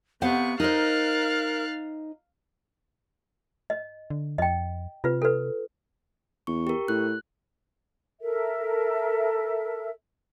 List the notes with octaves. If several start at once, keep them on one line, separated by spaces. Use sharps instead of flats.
C3 B3 C5 F5 F#5 C#6
D#4 A#4 C5 F5 F#6 A6
D#5
D3
F2 D#5 G5
C3 F4 B4
A4 B4
E2 C#6
G4 A#4
A2 F#6
A4 A#4 E5